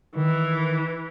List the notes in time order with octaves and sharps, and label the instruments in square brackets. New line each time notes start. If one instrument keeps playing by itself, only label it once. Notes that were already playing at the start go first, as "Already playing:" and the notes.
[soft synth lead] D#3 [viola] E3